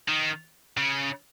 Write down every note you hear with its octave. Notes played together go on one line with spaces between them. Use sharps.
D#3
C#3